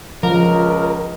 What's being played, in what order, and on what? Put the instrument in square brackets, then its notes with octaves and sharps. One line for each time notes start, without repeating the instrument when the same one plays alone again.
[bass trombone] C#2 [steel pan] F3 [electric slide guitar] A#4